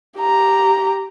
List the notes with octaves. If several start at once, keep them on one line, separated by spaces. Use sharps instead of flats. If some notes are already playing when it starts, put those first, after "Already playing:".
G4 A#5